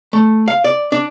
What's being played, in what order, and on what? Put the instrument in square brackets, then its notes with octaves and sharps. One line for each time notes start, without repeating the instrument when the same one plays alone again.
[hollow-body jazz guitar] A3
F5
D5
D4